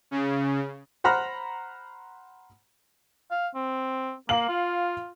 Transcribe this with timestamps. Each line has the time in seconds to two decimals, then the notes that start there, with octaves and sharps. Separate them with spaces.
0.11 C#3
1.04 C5 F#5 A#5 B5 F6
3.31 F5
3.55 C4
4.29 A#3 F5 F#7
4.49 F4